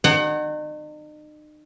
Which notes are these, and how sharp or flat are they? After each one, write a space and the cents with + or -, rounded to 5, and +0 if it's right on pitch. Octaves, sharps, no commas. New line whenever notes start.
D#4 -40 C#5 -40 F#5 +20